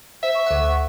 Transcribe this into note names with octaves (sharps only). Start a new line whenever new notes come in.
C5 E5
C#6
D2 F#5